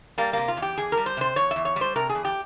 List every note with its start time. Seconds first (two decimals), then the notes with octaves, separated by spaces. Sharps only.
0.18 G3 A#3
0.33 C3 A#3
0.48 F4
0.57 E2
0.62 G4
0.77 E2 G#4
0.92 A#4
0.97 G3
1.06 C5
1.17 C3 C5
1.36 E2 C#5
1.51 E5
1.56 E2
1.65 C#5
1.76 G3
1.81 C5
1.96 C3 A#4
2.09 G#4
2.15 E2
2.25 G4